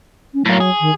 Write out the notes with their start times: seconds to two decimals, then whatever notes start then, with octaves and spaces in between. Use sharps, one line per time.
0.34 C#4
0.46 A2 F#3 A#3
0.60 G#4
0.80 D#3